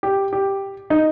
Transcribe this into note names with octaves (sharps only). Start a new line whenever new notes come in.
G4
G4
D#4